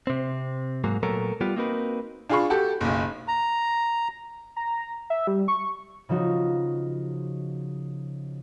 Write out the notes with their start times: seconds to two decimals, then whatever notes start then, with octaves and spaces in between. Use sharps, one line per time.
0.07 C3 C4
0.84 G#2 F#3 A#3
1.03 A#2 F#3 A3 B3 A4 A#4
1.41 G3 B3 F4 G4
1.56 A#3 C4 D#4 F#4 A#4 B4
2.29 D4 F4 G#4 F5 B5 C#6
2.50 F#4 G4 A4
2.81 F#1 B1
3.28 A#5
4.56 A#5
5.10 E5
5.27 G3
5.48 C#6
6.09 C#3 F3 D#4 F#4